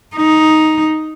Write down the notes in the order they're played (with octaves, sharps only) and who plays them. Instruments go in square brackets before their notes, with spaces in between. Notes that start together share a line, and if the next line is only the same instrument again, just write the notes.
[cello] D#4